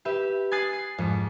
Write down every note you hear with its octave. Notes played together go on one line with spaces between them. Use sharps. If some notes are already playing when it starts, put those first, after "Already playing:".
G4 B4 E5
G#5 D#6 F#6 A6 C7
C7
F2 G#2